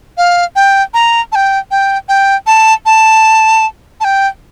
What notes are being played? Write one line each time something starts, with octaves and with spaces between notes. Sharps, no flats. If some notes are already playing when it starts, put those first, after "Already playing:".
F5
G5
A#5
A5
G5
G5
G5
A5
A5
A5
G5